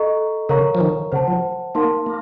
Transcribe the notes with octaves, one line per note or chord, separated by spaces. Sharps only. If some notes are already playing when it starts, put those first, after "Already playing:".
Already playing: A4 D#5 A#5 C#6
C#3 A#4 C#5 F5 A#5 C#6
F3
D#3
C#3 C5 F#5 A5
F3
A#3 D#4 A#4 F5 A5 C6
A#3